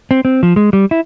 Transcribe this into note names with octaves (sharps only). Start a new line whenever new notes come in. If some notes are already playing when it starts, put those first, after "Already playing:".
C4
C4
F3
G#3
G3
E4